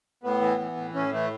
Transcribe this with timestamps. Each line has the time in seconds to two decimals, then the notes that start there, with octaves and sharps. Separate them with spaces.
0.24 A2 B3
0.41 E3
0.59 E3
0.77 A2
0.94 A2 C#4
1.13 E3 A3